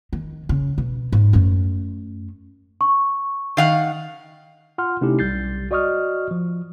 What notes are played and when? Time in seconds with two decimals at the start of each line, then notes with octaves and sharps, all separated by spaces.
0.13 D#3
0.49 C#3
0.78 B2
1.12 G#2
1.33 F#2 A3
2.81 C#6
3.57 D#3 F5 F#5
4.78 F4 F#5 C6 F6
5.01 C3 A3 C#4 D#4 E4 G4
5.19 B1 G3 G6 A6 C7
5.71 F#4 D5 D#5 C#6 D#6 F6
6.31 F3